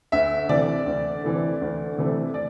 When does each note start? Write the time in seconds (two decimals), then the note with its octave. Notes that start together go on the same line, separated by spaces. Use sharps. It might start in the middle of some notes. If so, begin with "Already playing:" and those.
0.12 D2 E5
0.49 C3 E3 A3 D5
0.86 D2
1.24 C3 E3 A3
1.61 D2
1.98 C3 E3 A3
2.34 D5